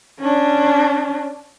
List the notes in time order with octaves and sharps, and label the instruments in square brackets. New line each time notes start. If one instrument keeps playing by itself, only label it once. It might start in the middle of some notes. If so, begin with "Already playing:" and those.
[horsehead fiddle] C#4 D4